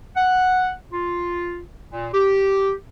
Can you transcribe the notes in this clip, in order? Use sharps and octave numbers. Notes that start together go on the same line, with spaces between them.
F#5
F4
A#2
G4